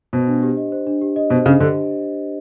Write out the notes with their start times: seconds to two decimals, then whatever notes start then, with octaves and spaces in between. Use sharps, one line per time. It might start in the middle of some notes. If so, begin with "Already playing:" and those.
0.13 B2 C5
0.27 D4
0.43 G4
0.57 D#5
0.72 C5
0.87 D4
1.02 G4
1.16 D#5
1.30 B2 C5
1.46 C#3 D4
1.60 D3 G4